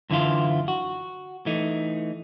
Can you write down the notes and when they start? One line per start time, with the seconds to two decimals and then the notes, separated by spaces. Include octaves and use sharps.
0.10 F#2 D3 E3 E4 F4
0.68 F#4
1.46 E3 A3 D#4